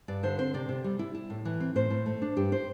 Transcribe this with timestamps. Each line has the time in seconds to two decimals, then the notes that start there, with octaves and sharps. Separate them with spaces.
0.08 G2 D5
0.23 D3 C5
0.38 C4 C5
0.54 C3 D5
0.69 C3
0.84 G3
0.99 E4
1.15 E4
1.30 A2
1.45 E3
1.60 C4
1.75 A2 C5
1.90 A2
2.06 A3
2.22 D4
2.37 G2 G4
2.52 C5